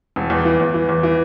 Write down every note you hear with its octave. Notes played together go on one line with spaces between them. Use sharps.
E1
E2
E3
E2
E3
E2
E3